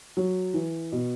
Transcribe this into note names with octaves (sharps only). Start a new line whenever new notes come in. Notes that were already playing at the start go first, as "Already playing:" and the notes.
F#3
E3
B2